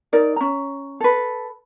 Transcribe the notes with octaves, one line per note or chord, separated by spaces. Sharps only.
D#4 A#4 D5
C#4 A#5
A4 B4